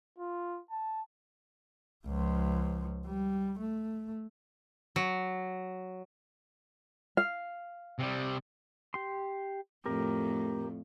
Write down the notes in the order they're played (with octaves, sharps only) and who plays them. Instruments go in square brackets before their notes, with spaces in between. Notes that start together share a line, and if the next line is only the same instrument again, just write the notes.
[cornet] F4
A5
[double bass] C#2 F3
G3
A3
[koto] F#3
[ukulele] F5
[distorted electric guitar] C3 G3
[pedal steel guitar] G4 C6
[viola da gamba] F2 A2 [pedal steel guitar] G4 A#4